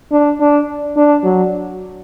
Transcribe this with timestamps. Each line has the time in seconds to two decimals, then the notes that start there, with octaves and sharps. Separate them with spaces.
0.12 D4
0.40 D4
0.96 D4
1.24 F#3